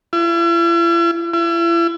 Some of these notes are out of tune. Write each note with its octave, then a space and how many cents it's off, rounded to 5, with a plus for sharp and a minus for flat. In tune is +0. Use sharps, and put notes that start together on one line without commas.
E4 +45
E4 +40